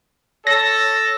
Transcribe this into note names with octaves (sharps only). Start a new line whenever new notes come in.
A4 C#5 A#6